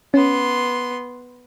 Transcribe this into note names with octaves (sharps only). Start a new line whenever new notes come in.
B3 C#4 C6